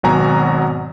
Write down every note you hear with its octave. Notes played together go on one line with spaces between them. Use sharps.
G#1 B2 F#3 F#4 G#5 A#5